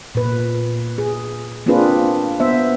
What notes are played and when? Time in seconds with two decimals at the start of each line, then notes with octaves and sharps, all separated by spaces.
0.15 A#2 B4
0.98 G#4
1.66 A#3 C4 D4 F4 G#4 B4
2.40 B3 C5 E5